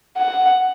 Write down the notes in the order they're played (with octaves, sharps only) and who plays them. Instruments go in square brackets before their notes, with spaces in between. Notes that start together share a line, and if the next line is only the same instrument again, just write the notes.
[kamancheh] F#5